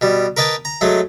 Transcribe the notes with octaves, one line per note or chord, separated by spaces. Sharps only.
B2 G3
A#4 B4 D#5 G5 A5
A#5
F#3 G#3 A3